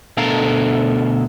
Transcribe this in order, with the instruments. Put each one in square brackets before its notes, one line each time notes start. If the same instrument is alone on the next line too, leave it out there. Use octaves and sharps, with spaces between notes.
[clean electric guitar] D2 B2 D3 A4 A#4 F5